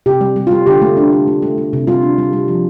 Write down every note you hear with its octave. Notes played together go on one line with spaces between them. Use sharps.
C3 G4
G3
G3
G3 F4
D3 G4
A3
D4
A3
A3
A3
A3
C3
G3 F4
D4
G3
G3
F3